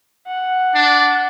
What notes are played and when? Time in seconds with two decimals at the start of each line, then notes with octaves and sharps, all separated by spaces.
0.27 F#5
0.75 D4